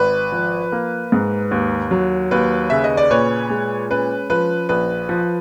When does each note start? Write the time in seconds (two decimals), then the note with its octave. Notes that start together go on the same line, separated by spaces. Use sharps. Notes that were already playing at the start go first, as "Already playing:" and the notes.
Already playing: G#1 B4
0.32 F3
0.72 A#3
1.12 G#2
1.51 D#2
1.91 F#3
2.31 D#2 B4
2.70 C#3 E5
2.84 D#5
2.97 D5
3.11 A#2 B4 C#5
3.50 G#3
3.89 C#4 B4
4.30 F3 B4
4.69 A#1 B4
5.09 F3